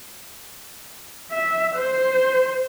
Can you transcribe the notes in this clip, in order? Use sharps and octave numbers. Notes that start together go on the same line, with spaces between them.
E5
C5